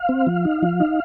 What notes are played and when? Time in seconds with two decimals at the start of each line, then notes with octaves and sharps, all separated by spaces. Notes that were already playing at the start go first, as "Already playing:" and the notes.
Already playing: F5
0.09 C4
0.27 F3
0.45 D#4
0.62 F3
0.80 D#4